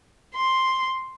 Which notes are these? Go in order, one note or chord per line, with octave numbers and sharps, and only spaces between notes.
C6